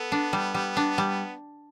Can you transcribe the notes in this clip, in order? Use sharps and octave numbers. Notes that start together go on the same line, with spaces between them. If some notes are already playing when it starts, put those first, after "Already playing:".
Already playing: B3 A4
D4
G3
G3
D4
G3